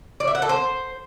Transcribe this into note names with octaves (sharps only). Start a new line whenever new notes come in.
D5
E5
F#5
A4
C5